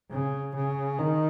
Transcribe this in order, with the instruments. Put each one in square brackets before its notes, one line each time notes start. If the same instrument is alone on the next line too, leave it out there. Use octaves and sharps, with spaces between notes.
[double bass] C#3
C#3
D#3